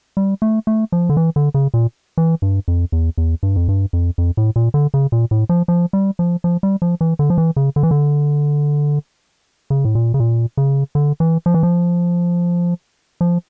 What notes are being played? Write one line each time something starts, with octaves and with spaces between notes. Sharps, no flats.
G3
A3
A3
F3
D3
E3
D3
C#3
A#2
E3
G2
F2
E2
E2
G2
F2
G2
F2
F2
A2
A#2
D3
C#3
A#2
A2
F3
F3
G3
F3
F3
G3
F3
E3
D3
F3
E3
C#3
D3
E3
D3
C#3
A2
A#2
C#3
A#2
C#3
D3
E3
F3
E3
F3
F3